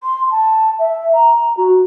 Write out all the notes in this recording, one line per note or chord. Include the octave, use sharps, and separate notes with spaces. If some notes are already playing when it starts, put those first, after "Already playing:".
C6
A5
E5
A#5
F#4